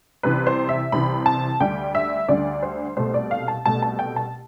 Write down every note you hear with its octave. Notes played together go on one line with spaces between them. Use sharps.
C2 C3 E3 B4
C5
E5
C2 C3 E3 B5
A5
D2 D3 G3 G5
E5
D2 D3 G3 D5
C5
C2 B2 A3 C5
D5
F5
A5
C2 B2 A3 A5
A5
G5
A5